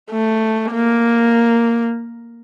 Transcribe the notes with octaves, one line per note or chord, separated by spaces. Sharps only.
A3
A#3